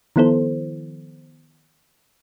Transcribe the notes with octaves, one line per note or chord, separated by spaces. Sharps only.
D#3 F3 B3 E4 A4 C5